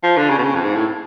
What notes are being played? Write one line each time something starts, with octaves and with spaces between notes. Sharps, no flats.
F3
D3
C#3
B2
C#3
F2
G#2
A2